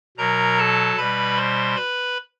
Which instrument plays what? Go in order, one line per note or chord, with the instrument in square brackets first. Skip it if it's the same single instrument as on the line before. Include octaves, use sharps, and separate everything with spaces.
[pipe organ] B2 F#3 A#4 A#5
A4 A5
B2 G3 B4 B5
C5 C6
B4 B5